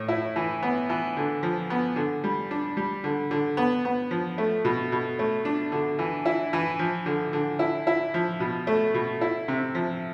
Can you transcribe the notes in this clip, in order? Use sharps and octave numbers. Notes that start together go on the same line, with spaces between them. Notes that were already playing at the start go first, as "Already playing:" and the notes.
Already playing: A2
E4
E3
B3
E3
D3
F3
B3
D3
G3
D4
G3
D3
D3
B3
B3
F3
A3
B2
B2
A3
D4
D3
E3
E4
E3
F3
D3
D3
E4
E4
F3
B2
A3
B2
E4
C3
F3